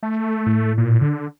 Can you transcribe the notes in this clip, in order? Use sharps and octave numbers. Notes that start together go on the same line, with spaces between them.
A3
A2
A#2
D3